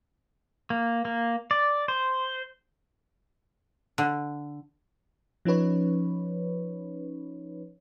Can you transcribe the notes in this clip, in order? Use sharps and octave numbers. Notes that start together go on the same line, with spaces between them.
A#3
A#3
D5
C5
D3
F3 C#4 D#4 B4 C#5